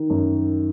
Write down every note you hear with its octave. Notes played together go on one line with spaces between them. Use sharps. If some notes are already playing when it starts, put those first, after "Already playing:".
Already playing: D#3
F#2